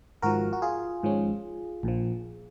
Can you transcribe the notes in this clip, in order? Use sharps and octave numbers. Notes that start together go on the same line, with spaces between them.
G#1 G#2 F3 F#4 A#4
F#4
F4 G#4
G#1 G#2 F3 G#3 C#4
A#1 A#2 F3